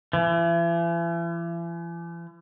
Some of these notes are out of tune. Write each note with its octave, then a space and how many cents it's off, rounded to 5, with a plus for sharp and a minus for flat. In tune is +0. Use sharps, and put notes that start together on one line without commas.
E3 +40